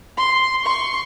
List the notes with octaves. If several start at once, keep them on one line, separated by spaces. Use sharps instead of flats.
C6
C6 C#6